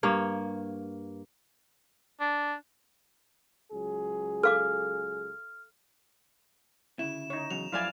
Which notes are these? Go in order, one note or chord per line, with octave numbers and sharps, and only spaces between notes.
G2 A#3 C#5
D4
C#2 F#3 G#4
A4 F5 D6 F6
D2 C#3 E4 E7
D#4 C#5
E2 C#3 F#3 F7
F#2 F3 A3 E4 D5 F5 G#5